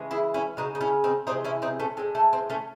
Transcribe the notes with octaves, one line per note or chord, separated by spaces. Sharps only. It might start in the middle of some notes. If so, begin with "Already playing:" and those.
Already playing: C#3 E3 G#3
E4 G#4
C#4 E4
C#3 G#3 D#4 F#4
D#4
C#4 E4
C4 D#4
C3 E3 G#3 C4 D#4
C#4 E4
C4 D#4
A3 C#4
A2 G#3 C4
A3
C4
A3 C#4